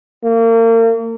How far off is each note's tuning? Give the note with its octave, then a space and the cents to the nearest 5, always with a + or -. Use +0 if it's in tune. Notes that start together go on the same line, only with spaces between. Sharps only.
A#3 -35